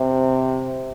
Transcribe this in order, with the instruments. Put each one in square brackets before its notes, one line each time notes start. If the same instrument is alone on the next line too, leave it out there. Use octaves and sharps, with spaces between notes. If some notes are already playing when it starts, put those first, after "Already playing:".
Already playing: [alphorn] C3